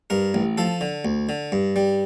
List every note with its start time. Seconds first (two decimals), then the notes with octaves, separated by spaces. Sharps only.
0.10 G2 A#4
0.34 A1
0.58 F3 A4
0.81 D3
1.05 D2
1.29 D3
1.52 G2
1.76 G3